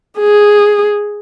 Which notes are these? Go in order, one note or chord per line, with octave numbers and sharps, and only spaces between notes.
G#4